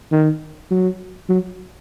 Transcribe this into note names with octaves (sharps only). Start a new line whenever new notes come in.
D#3
F#3
F#3